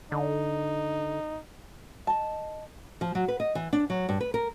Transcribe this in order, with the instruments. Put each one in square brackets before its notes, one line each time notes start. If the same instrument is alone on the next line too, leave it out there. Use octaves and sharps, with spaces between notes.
[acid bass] D3 [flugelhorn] D#4
[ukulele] D#5 A5
[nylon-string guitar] F3
F#3
B4
D#5
E3
D4
F#3
G2
B4
A#4